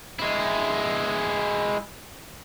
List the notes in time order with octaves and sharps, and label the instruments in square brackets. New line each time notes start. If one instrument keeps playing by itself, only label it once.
[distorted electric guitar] G#3 E4